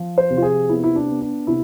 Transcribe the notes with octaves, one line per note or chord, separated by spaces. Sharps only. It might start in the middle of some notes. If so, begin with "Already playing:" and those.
Already playing: F3
C5
C3
F4
G#4
B3 E4
E4
D4
B3
D4
C3 E4